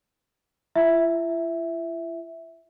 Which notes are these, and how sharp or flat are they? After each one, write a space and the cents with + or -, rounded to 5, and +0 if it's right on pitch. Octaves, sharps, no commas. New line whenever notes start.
E4 +45 E5 +0